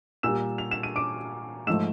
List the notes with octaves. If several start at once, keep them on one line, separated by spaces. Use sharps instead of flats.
A#2 G3 E6 E7
F7
E7
D#7
D6 D7
G#2 F3 A3 E6 E7